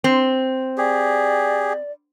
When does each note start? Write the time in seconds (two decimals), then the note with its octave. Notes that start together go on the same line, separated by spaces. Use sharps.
0.04 C4
0.78 G4 G#4 D5